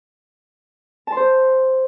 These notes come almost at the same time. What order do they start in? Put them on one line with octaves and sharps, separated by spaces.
A5 C6 C5